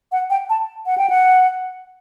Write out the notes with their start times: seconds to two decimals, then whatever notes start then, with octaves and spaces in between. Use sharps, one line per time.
0.12 F#5
0.30 G5
0.50 A5
0.86 F#5
0.98 G5
1.10 F#5